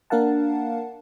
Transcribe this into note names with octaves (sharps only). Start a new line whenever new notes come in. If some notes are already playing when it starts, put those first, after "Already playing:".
A#3 D4 A#4 F5 F#5 A5